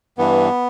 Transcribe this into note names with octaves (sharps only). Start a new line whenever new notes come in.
G2 E3 B3